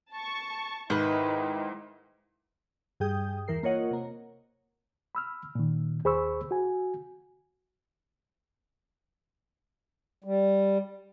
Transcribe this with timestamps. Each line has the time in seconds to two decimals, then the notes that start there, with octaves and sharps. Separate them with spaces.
0.12 A5 C#6
0.90 G#2 D#3 D#4 E4 B4
3.00 G2 G3 G#4 G5 D#6 G6
3.48 E2 E3 A#4 C7
3.63 A#3 F4 A#4 C#5 D#5 F#5
3.91 C3 A#3
5.15 B5 E6 F6
5.55 A#2 D#3
6.05 D#2 G#4 C5 B5 C#6 E6
6.51 F#4 G#5
10.24 G3